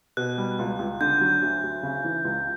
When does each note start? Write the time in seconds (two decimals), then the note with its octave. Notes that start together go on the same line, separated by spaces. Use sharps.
0.17 B2 F#6
0.38 G3
0.59 C#2
0.79 C#2
1.01 D3 G6
1.21 F#3
1.42 D2
1.63 D2
1.83 C#3
2.04 E3
2.25 C#2